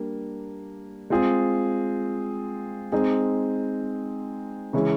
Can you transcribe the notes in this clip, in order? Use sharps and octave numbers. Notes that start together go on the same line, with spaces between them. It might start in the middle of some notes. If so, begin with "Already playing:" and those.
Already playing: G3 A#3 D4
G#3 C4 F4 G#4
G#3 C4 D#4 G#4
C#3 E3 G#3 C#4